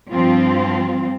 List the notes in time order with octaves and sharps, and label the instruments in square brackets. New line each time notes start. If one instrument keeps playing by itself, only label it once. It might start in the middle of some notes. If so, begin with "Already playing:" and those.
[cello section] G2 F3 C4 F4